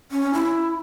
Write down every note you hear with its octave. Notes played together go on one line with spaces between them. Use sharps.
C#4
E4